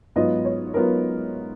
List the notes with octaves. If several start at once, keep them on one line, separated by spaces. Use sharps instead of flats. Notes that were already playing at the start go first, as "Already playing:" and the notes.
G#2 F#3 B3 F4 D#5
C#5
F#3 B3 F4 A#4